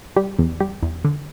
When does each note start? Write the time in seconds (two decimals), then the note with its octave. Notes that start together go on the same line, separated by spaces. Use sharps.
0.16 G3 G4
0.38 E2
0.60 G3 G4
0.83 E2
1.05 D3